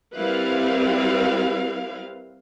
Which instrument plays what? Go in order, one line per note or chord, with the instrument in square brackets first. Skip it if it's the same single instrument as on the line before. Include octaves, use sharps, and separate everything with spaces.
[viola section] G3 C4 E4 A#4 B4 F5